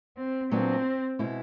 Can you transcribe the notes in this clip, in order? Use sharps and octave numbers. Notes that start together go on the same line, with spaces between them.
C4
A#2 F#3 B3 C4 D4
B2 G#3 B3 E4